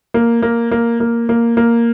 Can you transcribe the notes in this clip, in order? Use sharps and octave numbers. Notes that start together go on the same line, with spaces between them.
A#3
A#3
A#3
A#3
A#3
A#3